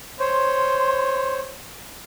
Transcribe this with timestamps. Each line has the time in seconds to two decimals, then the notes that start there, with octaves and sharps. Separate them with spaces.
0.20 C5 C#5 C6